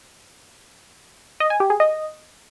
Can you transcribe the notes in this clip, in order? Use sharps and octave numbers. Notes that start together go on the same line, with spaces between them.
D#5
G#5
G4
G#4
D#5